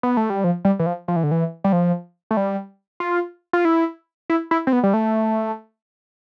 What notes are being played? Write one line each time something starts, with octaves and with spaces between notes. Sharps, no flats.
B3
A3
G3
F3
G3
E3
F3
F3
E3
D3
E3
G3
F3
A3
G3
F4
F4
E4
E4
E4
C4
B3
G3
A3